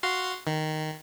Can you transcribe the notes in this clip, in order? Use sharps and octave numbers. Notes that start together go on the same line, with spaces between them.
F#4 F5 C6
D#3